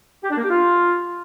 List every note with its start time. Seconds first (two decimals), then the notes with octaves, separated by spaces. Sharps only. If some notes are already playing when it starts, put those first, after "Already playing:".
0.24 G4
0.30 D4
0.37 A#3
0.43 G4
0.50 F4